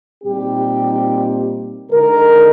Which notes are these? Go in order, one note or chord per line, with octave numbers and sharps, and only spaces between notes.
A#2 G3 C4 D#4 G4
D3 G#3 D#4 A#4